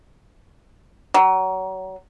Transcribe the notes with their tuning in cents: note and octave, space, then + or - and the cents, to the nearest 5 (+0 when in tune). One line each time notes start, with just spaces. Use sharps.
F#3 +30